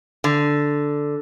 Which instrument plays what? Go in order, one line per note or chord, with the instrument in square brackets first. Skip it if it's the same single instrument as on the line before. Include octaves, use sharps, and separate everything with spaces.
[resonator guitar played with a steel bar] D3